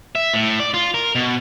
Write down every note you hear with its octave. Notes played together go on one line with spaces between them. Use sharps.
E5
A2
D5
F4
A#4
B2